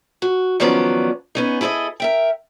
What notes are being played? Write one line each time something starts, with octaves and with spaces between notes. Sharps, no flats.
F#4
D#3 F3 F#3 B3 C#4 D5
B3 C#4 D#4
E4 G#4 A4 C#5 D#5
A#4 E5 G5